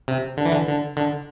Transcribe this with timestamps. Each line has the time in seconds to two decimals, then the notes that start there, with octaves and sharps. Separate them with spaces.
0.08 C3
0.37 D3
0.45 E3
0.52 D3
0.67 D3
0.97 D3